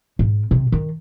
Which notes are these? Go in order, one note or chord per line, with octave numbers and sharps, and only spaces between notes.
G#2
C3
D#3